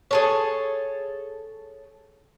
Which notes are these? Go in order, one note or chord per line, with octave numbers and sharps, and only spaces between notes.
G#4 A4 C#5